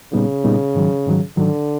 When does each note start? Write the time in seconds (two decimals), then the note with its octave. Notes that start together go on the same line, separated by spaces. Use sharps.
0.13 A#2 C#3 G3 B3 D#4
0.44 A#2 G3 B3 D#4
0.75 G#2 D#3 F#3
1.06 G#2 D#3 F#3
1.37 G#2 D3 D#3 F#3